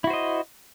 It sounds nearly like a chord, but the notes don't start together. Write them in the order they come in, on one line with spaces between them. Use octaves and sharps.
E4 F#4 C5 D#5